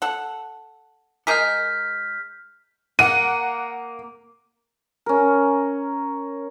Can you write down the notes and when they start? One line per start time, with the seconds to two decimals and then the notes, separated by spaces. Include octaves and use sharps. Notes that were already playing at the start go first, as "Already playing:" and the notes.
0.02 A4 F#5
1.27 G#3 G#4 A#4 F6 G6 B6
2.99 A#3 F#5 D#7
5.06 C#4 A#4